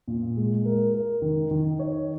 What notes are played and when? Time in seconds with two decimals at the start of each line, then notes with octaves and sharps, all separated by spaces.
0.08 A#2
0.37 G#3
0.65 A#4
0.94 A#4
1.22 D#3
1.51 D#3
1.79 C#5